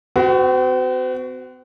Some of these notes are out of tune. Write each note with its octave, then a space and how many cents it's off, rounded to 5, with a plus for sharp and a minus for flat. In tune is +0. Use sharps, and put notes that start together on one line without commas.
C4 -45 F#4 +10